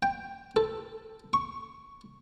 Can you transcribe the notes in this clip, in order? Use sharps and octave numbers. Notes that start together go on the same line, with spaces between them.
G5
A4
C#6